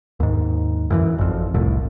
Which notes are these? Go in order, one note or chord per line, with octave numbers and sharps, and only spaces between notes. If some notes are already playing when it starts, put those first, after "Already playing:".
D#2 G#2
F#2 D#3 E3
G#1 F2
F1 C2 A2